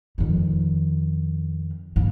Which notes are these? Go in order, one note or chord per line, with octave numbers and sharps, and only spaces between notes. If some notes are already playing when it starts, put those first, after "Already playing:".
F2 D#3
G2 A#3